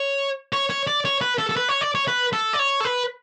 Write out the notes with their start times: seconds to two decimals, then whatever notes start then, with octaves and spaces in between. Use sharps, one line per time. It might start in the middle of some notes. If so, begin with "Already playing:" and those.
Already playing: C#5
0.53 C#5
0.70 C#5
0.87 D5
1.05 C#5
1.21 B4
1.38 A4
1.49 A4
1.56 B4
1.69 C#5
1.81 D5
1.95 C#5
2.08 B4
2.33 A4
2.53 D5
2.59 C#5
2.80 A4
2.85 B4